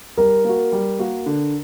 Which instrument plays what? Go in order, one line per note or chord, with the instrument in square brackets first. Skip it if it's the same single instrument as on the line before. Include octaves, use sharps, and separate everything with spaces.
[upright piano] G3 [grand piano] A#4
[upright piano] A#3 F#4
G3
A#3 F#4
D3